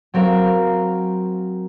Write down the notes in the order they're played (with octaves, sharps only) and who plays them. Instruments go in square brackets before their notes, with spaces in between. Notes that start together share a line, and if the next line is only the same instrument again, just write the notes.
[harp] F#3 C4 A#4 F5